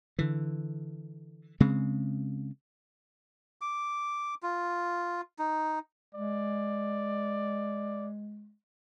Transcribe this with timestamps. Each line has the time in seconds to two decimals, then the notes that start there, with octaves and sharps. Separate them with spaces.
0.19 D3 E3
1.60 C#3 G#3 C4
3.61 D6
4.43 F4
5.39 D#4
6.14 G#3 D5